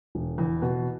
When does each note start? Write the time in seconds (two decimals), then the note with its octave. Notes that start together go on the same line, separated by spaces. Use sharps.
0.15 E1
0.38 E2
0.62 B2